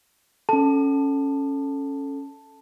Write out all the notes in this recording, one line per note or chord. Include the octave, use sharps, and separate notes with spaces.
C#4 A4 A5